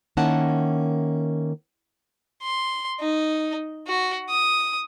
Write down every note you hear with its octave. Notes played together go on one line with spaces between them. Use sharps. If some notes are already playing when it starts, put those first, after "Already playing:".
D#3 A#3 C#4 E4 F#5 A5
C6
D#4
F#4
D#6